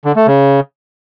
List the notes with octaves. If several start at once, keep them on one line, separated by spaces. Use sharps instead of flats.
D3
A3
C#3